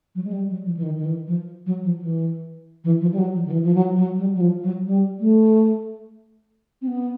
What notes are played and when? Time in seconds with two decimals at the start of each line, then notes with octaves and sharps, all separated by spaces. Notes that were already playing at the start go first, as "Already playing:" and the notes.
0.15 F#3
0.24 G#3
0.33 G3
0.50 F#3
0.65 F3
0.77 E3
0.83 D#3
0.97 D#3
1.05 E3
1.27 F3
1.66 F#3
1.84 F3
2.00 E3
2.84 E3
3.01 F3
3.13 G3
3.19 F#3
3.34 F3
3.46 D#3
3.51 E3
3.64 F3
3.75 F#3
3.96 F#3
4.18 G3
4.35 F#3
4.41 F3
4.63 F#3
4.86 G3
5.20 A3
6.82 C4
6.87 B3